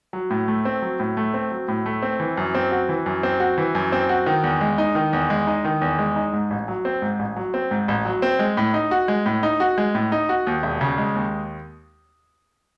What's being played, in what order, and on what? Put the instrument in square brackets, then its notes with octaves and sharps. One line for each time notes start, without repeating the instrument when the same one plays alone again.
[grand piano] F#3
A2
A3
C4
F#3
A2
A3
C4
F#3
A2
A3
C4
E3
F#2
C4
F#4
E3
F#2
C4
F#4
E3
F#2
C4
F#4
D#3
E2
G#3
D#4
D#3
E2
G#3
D#4
D#3
E2
G#3
D#4
G#2
A1
F#3
C4
G#2
A1
F#3
C4
G#2
A1
F#3
C4
G#3
A2
D#4
F#4
G#3
A2
D#4
F#4
G#3
A2
D#4
F#4
D#2
E1
C#3
G#3
D#2